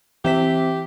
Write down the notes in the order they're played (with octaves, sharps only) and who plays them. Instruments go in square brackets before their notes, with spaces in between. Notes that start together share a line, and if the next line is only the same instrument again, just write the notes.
[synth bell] E3 E5 B6 [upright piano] C4 [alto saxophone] G4